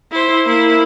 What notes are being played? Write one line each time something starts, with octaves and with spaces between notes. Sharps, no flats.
E4 C5
A#3 E4